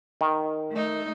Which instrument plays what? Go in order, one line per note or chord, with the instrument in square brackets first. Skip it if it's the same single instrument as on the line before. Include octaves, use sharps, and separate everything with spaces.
[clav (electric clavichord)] D#3
[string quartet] A3 D#4